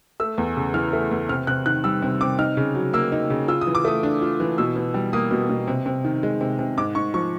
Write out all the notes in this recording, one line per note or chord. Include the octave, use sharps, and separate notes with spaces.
A3 E6
E2
C#3
E3 F6
A3
E2
C3 F6
C3 F#6
D#3 F#6
G3 E6
C3
C3 D6
D#4 F6
C#3
F#3
A#3 E6
D#4
C#3
F4 E6
D#6
E3
D6
A3 D#6
D4
F4
E3
B2 E6
B2
G3
A#3 D#6
B2
B2
C3
C3
D#3
G#3
C3
C3
G#2 D6
G#2 C#6
F3 C#6